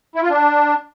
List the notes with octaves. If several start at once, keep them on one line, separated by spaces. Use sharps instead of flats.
E4
F4
D4